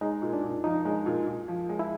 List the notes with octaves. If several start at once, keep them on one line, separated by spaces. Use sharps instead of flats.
G#3 D#4
A#2
D4
A#2
F3 D#4
G#3
A#2
A#2
F3
G#3
E4